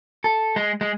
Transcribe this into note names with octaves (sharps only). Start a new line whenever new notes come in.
A4
G#3
G#3